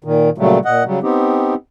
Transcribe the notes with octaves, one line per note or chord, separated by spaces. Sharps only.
A#2 D#3
A#2 C#3 F#3 G3 A3
A#2 D#5 F#5
C#3 F#3 G3
B3 C4 D#4 G4